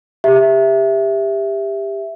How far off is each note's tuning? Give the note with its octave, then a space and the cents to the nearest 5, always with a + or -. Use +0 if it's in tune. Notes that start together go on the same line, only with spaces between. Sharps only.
G4 +20 E5 +0